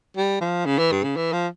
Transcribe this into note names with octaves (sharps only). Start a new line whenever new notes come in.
G3
F3
C#3
E3
G2
C#3
E3
F3